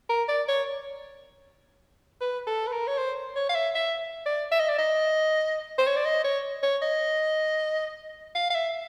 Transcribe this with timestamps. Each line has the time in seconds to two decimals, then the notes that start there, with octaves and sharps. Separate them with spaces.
0.10 A#4
0.28 D5
0.48 C#5
2.21 B4
2.47 A4
2.67 B4
2.72 A#4
2.87 C#5
2.98 C5
3.36 C#5
3.49 F5
3.55 E5
3.75 E5
4.26 D5
4.52 E5
4.60 D#5
4.69 D5
4.78 D#5
5.78 C5
5.87 C#5
5.96 D5
6.06 D#5
6.24 C#5
6.63 C#5
6.82 D#5
8.35 F5
8.50 F5
8.55 E5